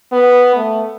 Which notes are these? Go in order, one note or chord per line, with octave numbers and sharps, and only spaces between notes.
B3
A3